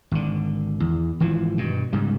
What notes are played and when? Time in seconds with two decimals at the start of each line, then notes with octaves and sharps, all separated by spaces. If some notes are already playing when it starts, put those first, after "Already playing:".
0.11 G#1 D3
0.80 E2
1.20 G#1 E3 F3
1.58 G2 B2
1.93 G#2 C#3 G3